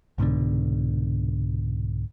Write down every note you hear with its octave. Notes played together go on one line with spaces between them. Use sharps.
C2 G#2 B2 D3